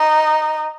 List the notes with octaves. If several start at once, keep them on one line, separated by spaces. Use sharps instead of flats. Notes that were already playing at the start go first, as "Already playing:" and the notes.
Already playing: D#4